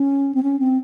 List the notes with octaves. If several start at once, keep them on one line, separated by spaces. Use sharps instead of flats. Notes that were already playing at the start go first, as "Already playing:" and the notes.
Already playing: C#4
C4
C#4
C4